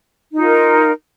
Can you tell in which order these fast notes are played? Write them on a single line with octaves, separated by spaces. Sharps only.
D#4 F4 A#4